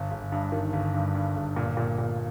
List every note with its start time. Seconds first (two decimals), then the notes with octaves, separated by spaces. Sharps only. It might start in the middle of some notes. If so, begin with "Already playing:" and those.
Already playing: G1
0.11 G1
0.32 G2
0.52 D#3
0.73 G1
0.94 G2
1.15 G2
1.36 G1
1.56 A#2
1.77 A#2
1.98 A#2